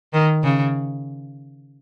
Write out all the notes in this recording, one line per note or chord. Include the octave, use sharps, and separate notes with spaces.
D#3
C#3